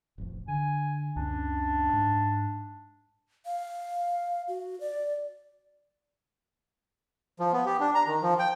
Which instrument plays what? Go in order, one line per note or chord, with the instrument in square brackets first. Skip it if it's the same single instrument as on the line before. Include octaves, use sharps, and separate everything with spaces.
[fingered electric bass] D#1 A1 F2
[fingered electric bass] D3 [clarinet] G#5
[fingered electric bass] C#2 F#2 C#4 [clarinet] D4
[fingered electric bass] G#2
[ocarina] F5
F#4
D5
[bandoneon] F3
B3
G4
D4
A#5
D#3
F3
G5